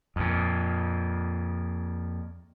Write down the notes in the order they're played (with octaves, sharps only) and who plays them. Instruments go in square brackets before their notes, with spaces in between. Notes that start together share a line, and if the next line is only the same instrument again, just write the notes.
[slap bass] F2 A#2